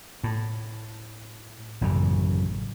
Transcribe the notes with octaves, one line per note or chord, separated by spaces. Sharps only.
A2
A1 F#2 A2 C#3